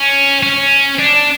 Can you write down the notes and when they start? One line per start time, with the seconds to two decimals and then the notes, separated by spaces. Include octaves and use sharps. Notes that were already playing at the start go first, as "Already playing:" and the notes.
Already playing: C#4
0.43 C#4
0.99 D4